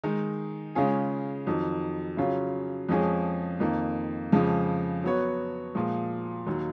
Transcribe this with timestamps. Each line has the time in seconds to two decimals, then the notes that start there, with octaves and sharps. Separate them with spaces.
0.04 D#3 G#3 D#4
0.75 C#3 G#3 C#4 F4 G#4
1.46 F2 D#3 F#3
2.17 C#3 F#3 C#4 F4
2.89 F2 F3 G#3 C#4 G#4
3.60 F2 D#3 A#3
4.32 F2 C#3 F3 G#3
5.04 F#3 B3 F#4 C#5
5.75 A#2 F3 G#3
6.46 D#2 D#3 F#3